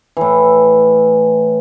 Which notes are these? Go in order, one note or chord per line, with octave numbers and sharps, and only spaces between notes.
A2 E3